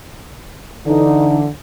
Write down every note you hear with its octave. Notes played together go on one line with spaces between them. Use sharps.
D3 E3 D#4